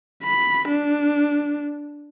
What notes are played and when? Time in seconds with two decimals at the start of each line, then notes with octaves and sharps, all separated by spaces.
0.23 B5
0.68 D4